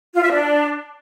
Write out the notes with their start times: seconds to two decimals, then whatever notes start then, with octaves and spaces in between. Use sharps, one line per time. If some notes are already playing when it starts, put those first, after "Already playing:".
0.14 F4
0.22 E5
0.31 D4